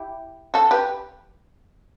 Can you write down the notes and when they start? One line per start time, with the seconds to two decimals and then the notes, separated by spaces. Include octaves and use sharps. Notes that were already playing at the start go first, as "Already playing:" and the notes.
Already playing: E4 G4
0.54 F#4 A4
0.71 G4 B4